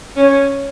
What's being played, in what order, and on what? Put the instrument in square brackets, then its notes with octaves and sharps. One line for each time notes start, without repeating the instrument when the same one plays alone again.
[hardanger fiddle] C#4